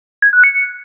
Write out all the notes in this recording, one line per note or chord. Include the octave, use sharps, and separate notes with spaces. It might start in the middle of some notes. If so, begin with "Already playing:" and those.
G#6
F#6
C#7